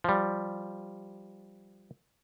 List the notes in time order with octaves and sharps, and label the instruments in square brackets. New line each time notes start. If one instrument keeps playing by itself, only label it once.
[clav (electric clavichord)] F3 G3